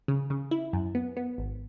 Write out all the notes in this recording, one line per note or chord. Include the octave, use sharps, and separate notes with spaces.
C#3
C#3
E4
F#2
B3
B3
G#1